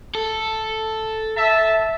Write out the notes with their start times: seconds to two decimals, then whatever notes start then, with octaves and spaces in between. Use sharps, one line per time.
0.15 A4
1.36 E5 A5